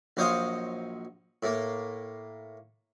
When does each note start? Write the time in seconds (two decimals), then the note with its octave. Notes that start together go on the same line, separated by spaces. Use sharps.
0.17 A#1 F#3 C5 C#5 D#5 F5
1.43 A2 A#3